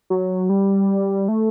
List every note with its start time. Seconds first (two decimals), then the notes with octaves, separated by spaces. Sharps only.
0.10 F#3
0.49 G3
1.28 A3